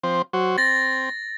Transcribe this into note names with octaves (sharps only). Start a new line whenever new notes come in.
F3 C4 C5
F#3 F#4 C5
C4 A6 A#6